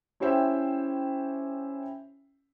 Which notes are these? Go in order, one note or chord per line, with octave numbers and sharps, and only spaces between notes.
C#4 E4 G4 C5 E5 G5